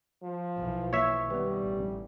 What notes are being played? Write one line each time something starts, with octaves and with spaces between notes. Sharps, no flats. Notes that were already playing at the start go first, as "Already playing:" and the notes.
F3
B1 E3
A#3 C#5 E5
D#3 G3 B3 B4
A1